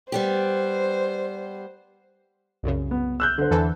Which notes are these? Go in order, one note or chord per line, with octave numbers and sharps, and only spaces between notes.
G3 B3 G4 C5
C2 F#2 C#3
B3
E6 F#6 G6
D3 C5
E2 E3 A4